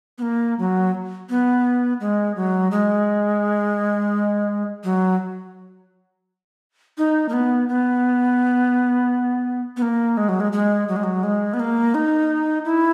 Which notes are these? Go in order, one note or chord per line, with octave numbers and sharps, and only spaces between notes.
B3
A#3
F#3
B3
G#3
F#3
G#3
F#3
D#4
A#3
B3
B3
B3
A#3
G#3
F#3
G#3
G#3
F#3
G#3
F#3
G#3
B3
A#3
D#4
E4